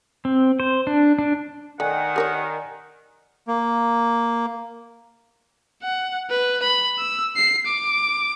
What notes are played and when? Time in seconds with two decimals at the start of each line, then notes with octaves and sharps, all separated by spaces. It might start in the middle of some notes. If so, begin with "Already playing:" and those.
0.25 C4
0.60 C5
0.87 D4
1.19 D4
1.80 D#3 A3 D5 F#5 G#5
2.16 G4 A#4 C#5
3.48 A#3
5.83 F#5
6.30 B4
6.63 B5
6.98 E6
7.36 C7
7.67 D6